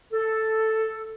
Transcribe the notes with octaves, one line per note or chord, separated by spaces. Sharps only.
A4